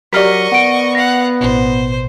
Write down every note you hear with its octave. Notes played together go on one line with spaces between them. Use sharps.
F#3 G4 A#4 D5 D#5 C#6 F6 B6
B3 F#5 D7
F5 F#5 A#6
A1 B2 C5